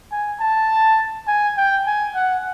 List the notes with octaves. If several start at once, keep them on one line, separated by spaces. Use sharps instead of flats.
G#5
A5
G#5
G5
G#5
F#5